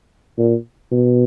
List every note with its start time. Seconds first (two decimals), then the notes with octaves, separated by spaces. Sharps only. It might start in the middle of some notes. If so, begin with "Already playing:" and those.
0.38 A#2
0.91 B2